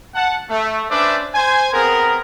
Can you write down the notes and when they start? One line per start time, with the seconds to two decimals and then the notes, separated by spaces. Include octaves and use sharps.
0.15 F#5 A5
0.49 A3
0.90 C#4 D4 B4 C5 D5 E5
1.35 C5 G#5
1.72 B3 C4 G#4 A#4